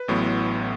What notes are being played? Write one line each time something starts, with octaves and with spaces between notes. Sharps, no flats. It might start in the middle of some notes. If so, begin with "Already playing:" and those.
Already playing: B4
A1 A2 F#3 B3